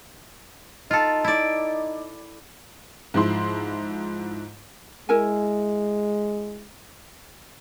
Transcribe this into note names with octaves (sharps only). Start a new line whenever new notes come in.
D#4 F4 A4
E4 D5
G#2 F3 E4 C6
G#3 E4 A#4 G#5